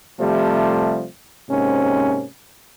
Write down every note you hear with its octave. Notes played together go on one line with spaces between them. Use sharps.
C3 F3 G3 A3
G#2 C3 A#3 C#4